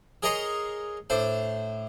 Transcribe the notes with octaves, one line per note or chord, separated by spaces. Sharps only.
G#4 A#4 C#5 D#5 A#5 C6
A2 D4 C5